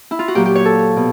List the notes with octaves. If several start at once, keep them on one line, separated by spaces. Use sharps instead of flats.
E4
F4
F#4
A#2 F#3 A#3 G4
G4
C#5
A4
B2